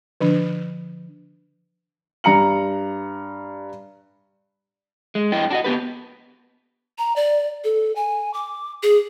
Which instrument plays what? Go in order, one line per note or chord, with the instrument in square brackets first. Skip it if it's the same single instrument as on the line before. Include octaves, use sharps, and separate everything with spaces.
[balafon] D3 F3 D4
[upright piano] G2 A#5 C#7 F#7
[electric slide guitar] G#3
G2 E4 D#5 G5
D4 F#4 D#5
B3 G4 B4
[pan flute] A#5
D5
A4
G#5
D6
G#4